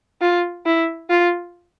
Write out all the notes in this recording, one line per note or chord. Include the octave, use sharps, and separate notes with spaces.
F4
E4
F4